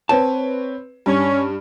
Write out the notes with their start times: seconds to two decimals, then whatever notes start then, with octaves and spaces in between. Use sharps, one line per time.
0.09 C4 B4 C#5 A5
1.06 G2 C#4